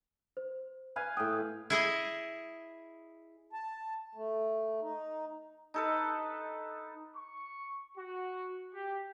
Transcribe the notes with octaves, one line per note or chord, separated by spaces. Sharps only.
C5
B4 F5 G#5
A2 G5 D#6
E4 G#4 D#5
A5
A3
D#4
D#4 A4 B4
C#6
F#4
G4